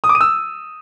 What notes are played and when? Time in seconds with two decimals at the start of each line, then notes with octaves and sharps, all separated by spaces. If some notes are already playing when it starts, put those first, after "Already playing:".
0.04 D#6
0.09 D6
0.15 D#7
0.21 E6